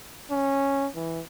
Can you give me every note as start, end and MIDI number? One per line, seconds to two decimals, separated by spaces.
0.31 0.88 61
0.95 1.21 52